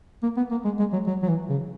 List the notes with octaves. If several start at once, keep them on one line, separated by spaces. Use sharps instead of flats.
A#3
B3
A#3
G#3
G#3
F#3
F#3
F#3
E3
C#3